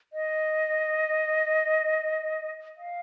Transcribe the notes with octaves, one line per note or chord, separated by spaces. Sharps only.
D#5
F5